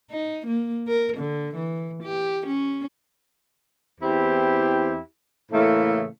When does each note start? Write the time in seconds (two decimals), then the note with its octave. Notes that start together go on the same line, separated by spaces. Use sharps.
0.10 D#4
0.47 A#3
0.87 A#4
1.17 D3
1.55 E3
2.03 G4
2.46 C#4
4.01 E2 C4 E4 G4
5.52 A2 C#3 E3 A3 A#3